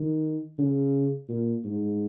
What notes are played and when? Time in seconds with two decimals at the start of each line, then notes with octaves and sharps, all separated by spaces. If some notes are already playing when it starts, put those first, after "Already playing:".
Already playing: D#3
0.58 C#3
1.29 A#2
1.64 G#2